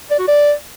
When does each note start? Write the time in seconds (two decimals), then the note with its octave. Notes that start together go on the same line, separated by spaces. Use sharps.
0.11 D5
0.19 F#4
0.28 D5